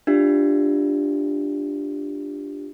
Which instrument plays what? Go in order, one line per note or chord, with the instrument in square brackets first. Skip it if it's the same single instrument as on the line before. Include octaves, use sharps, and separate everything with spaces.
[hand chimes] D4 F4 G4 E5